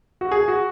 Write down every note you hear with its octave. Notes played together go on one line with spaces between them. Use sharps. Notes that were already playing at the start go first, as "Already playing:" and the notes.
F#4
G#4
F#4